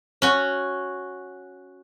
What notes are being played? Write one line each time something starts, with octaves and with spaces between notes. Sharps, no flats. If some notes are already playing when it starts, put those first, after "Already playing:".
C#4 F#4